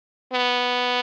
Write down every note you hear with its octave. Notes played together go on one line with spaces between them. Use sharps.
B3